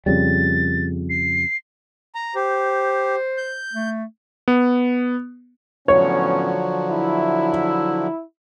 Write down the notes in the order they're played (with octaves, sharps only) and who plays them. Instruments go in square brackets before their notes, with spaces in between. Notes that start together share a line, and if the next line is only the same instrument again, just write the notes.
[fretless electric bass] F2 C#3 G3 [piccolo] A6
[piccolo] C7
[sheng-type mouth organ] A#5
[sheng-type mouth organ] G4 [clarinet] C5
[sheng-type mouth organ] G6
[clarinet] A3
[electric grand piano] B3
[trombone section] A2 B3 C#4 [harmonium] D3 F3 F#3 [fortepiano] C#5
[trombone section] E4